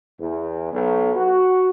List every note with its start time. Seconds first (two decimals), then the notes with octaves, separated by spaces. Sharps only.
0.18 E2
0.71 B1
1.15 F#4